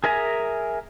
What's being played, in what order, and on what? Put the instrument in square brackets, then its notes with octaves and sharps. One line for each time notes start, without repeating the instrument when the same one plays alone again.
[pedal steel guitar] G#4 A#4 E5 G#5 A#5